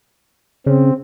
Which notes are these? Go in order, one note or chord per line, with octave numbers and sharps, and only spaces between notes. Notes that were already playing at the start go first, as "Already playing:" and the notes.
C#3 C4